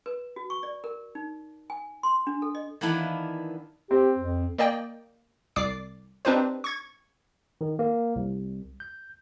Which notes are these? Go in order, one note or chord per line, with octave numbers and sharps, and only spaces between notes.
B4
F#4
C#6
D5
A#4
D#4
G#5
C6
D4
A4
D#5
D#3 E3 A#3 B3 D4 E4
C4 G4
F2
A#3 D5 D#5 G5
C2 D5 D6 C7
C4 D4 D#4 G4 B4 C5
C#6 G#6
D#3
A#3
C2
G6